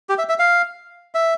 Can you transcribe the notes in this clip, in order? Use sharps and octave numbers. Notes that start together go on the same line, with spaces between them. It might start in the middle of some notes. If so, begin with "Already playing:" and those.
G4
E5
E5
F5
E5